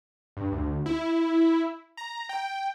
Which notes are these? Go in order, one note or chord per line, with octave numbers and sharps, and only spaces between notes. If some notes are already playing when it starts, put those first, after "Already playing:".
G2
D2
E4
A#5
G5